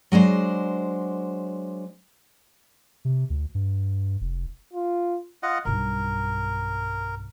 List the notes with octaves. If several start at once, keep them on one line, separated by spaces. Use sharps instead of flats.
F#3 G#3 D4 C5
C3
D2
G2
F1
F4
F4 D#5 F#5
B1 G2 A#4